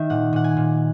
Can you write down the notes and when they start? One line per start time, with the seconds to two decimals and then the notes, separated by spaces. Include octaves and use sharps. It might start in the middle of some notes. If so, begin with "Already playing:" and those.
Already playing: D#3 E5
0.10 A#2 F#5
0.33 A#2 F#5
0.44 G#5
0.57 A#2